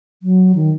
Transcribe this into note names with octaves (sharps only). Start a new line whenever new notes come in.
F#3
D#3